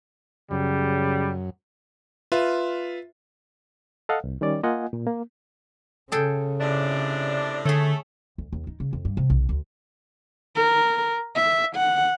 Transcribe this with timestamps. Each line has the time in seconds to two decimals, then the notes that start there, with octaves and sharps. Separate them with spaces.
0.51 F#2 C#3 G3
2.32 F4 B4 E5
4.09 A4 D#5 F5 F#5
4.24 C2
4.41 D#3 G3 C#4 D5
4.63 A#3 F4 D#5 F#5 G#5
4.93 A#2
5.07 A#3
6.12 C#3 G#4 A4 G5
6.60 A2 C3 D4
7.65 D3 A3 G#4 C#5
8.38 D2
8.53 D#2
8.67 D#4
8.80 C#3
8.93 F2
9.05 G2
9.17 C3
9.30 B1
9.49 D2
10.56 A#4
11.35 E5
11.76 F#5